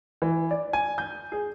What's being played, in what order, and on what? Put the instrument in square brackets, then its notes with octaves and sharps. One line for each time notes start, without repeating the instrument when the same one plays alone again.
[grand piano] E3
D5
G#5
G6
G#4